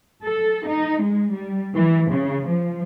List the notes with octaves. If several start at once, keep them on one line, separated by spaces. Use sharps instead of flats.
A4
D#4
G#3
G3
E3
C#3
F3